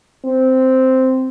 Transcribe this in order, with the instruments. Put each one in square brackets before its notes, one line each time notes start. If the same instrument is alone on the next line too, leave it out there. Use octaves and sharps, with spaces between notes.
[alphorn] C4